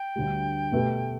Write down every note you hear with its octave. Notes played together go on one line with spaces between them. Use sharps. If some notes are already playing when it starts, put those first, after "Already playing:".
Already playing: G5
D2 D3 G3
B2 A3 G4 B4